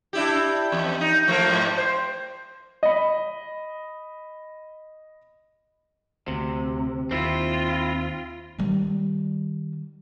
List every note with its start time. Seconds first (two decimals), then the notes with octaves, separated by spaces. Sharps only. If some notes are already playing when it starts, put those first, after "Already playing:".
0.13 D4 E4 G4
0.72 E2
1.01 D#4
1.28 F3 A3 A#3
1.49 G#2
1.77 C5
2.83 D#5 B5
6.28 D2 C3
7.11 D#2 C4 E4 F4
8.58 D#3 G3